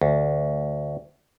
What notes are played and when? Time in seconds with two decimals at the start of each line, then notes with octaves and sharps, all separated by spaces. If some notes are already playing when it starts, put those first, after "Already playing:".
0.01 D2